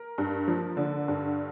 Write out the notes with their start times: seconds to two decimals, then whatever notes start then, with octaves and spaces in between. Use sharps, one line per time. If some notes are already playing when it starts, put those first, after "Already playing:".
Already playing: A#4
0.18 G2
0.48 F3
0.77 D3
1.08 G2